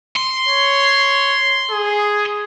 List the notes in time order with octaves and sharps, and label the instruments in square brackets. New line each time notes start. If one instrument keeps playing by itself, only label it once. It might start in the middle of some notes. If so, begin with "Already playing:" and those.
[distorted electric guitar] C6
[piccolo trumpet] C#5
G#4